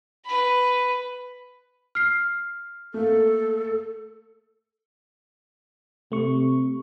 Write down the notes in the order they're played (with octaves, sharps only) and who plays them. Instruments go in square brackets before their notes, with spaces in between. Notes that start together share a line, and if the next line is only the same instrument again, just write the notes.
[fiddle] B4 B5
[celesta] F6 C7
[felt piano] A3 A#3 [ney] A4
[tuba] C3 [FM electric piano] A3 C#6